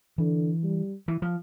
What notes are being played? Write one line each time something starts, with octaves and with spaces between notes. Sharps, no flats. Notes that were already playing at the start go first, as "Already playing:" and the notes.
D3 E3
G3
E3
F3